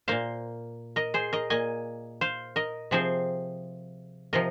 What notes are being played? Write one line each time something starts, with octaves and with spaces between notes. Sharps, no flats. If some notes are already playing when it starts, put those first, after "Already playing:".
A#2 A#3 C5 F5
A#4 D#5
G#4 C5
A#4 D#5
A#2 A#3 D#5 G#5
C5 F5
A#4 D#5
C3 F3 C4 G#4 C5
C3 F3 A#4 D#5